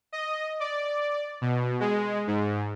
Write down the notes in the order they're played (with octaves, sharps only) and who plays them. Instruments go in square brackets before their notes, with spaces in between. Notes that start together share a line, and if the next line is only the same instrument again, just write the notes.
[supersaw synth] D#5
D5
B2
G#3
G#2